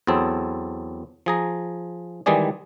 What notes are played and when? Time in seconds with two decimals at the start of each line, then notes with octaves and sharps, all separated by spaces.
0.07 E2 F#3 C4 A4
1.26 F3 G#4 A#5
2.26 D#3 E3 G3 G#3 G#4 D5